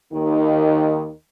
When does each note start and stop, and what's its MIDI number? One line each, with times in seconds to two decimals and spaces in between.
0.13 1.09 39
0.13 1.09 51